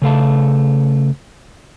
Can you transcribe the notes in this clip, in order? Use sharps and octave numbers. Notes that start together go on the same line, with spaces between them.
C#3 A3 F5 A5